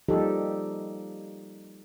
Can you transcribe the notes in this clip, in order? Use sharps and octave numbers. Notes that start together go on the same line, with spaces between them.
F3 G3 A#3 D#4 G4 A4